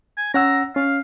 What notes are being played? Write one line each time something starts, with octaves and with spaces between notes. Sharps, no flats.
G#5
C#4 F#5 A#5 E6
C#4 F5